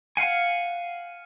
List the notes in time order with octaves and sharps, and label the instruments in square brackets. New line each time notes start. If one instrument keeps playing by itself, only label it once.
[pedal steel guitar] F5 F#5 G#5